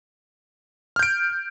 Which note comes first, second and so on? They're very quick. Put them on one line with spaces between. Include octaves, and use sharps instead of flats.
F6 G6 D7